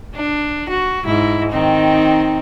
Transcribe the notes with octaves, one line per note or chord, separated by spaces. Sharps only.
D4
F#4
G#2 E4
D#3 C4 D#4